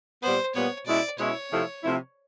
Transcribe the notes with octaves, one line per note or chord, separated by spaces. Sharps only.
A#2 G3 B3 C5
A#2 G3 B3 C#5
B2 G#3 C#4 E4 D5
B2 G#3 C#4 E4 C#5
C3 F3 A3 C4 E4
C3 F3 A3 C4 E4